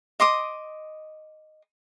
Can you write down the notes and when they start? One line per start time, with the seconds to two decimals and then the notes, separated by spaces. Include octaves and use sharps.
0.20 D#5 C6 D6 D#6